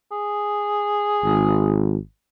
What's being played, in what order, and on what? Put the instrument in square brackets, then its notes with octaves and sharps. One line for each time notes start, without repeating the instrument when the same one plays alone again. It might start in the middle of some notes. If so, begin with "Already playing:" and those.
[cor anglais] G#4
[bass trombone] G#1